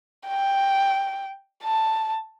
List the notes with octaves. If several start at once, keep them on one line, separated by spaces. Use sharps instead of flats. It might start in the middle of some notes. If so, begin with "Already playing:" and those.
G5
A5